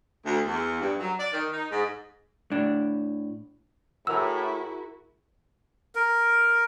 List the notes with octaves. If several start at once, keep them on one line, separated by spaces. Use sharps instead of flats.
D2
E2
G2
F#3
D5
D#3
D#4
G#2
A2 D4
A2 E4 F#4 G#4 A#4 F#5 E6
A#4